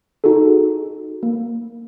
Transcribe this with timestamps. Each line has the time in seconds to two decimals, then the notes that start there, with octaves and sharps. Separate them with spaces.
0.24 D#4 F#4 G#4 A4
1.23 A#3